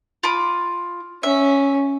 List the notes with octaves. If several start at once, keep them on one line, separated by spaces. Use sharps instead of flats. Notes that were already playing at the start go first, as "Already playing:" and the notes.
F4 B5 D6
C#4 E5